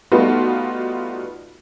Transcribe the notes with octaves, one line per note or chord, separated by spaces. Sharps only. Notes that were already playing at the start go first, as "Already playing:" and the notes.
G3 A3 B3 D#4 F4 F#4